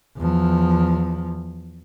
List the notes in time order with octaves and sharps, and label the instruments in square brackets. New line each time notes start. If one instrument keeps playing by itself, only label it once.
[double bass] E2 F3